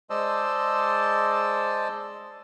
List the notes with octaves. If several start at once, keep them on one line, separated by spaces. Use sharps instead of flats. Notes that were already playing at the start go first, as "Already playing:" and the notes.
G#3 C5 D5 D#5 A5 E6